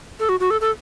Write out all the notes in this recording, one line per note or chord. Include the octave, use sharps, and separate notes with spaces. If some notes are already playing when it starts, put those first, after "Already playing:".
A4
F#4
F#4
A4
A4